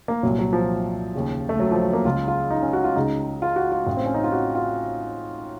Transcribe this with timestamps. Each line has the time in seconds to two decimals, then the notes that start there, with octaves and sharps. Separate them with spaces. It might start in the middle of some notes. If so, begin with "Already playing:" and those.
0.08 A#3
0.23 C2 A#2 F#3
0.39 F#3
0.53 F3
1.14 D#2 C#3
1.49 A3
1.59 F#3
1.71 F3
1.82 F#3
1.93 A#3
2.05 C#2 C#3 F4
2.28 F4
2.50 D#4
2.62 C#4
2.73 F#4
2.84 F4
2.96 C#2 C#3 D#4
3.42 F4
3.56 F#4
3.72 F4
3.87 A1 A2
3.97 C4
4.06 C#4
4.14 D#4
4.24 F4
4.32 F#4
4.55 F4